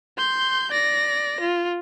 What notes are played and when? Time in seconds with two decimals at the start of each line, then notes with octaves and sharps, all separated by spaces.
0.18 C6 G6
0.72 D5 A#6
1.41 F4